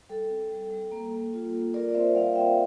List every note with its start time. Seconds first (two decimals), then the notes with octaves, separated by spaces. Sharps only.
0.09 G3 A4
0.30 C4
0.51 G3
0.71 G3
0.91 A#3
1.13 A#3
1.33 F4
1.53 A#3
1.74 F4 A#4 D5
1.89 D5
1.94 C4 C5 E5
2.15 G3 D5 F5
2.36 C4 E5 G5